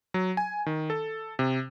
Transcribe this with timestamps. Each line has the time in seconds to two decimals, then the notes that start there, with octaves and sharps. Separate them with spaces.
0.14 F#3
0.37 G#5
0.66 D#3
0.90 A4
1.39 C3